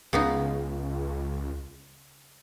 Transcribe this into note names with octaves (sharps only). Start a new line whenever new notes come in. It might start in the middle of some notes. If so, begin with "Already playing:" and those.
C#2 C#3 B3 D#4